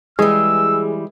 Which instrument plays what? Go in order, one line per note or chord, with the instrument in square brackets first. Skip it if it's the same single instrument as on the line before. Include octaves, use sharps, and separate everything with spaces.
[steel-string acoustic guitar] E3 G3 [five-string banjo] G#3 [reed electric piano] G#4 [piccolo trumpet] E6